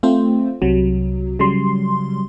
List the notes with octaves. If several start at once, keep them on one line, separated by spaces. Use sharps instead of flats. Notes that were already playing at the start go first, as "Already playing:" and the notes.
A3 C4 F4 C5
C2 C3 F#3
C#3 F#3 G3 C6